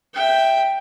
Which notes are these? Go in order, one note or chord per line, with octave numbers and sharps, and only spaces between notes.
E5 G5